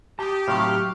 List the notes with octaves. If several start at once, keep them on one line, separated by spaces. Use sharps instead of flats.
G4 A5 D#6
A2 C3 D#3 F#3 F5 C#6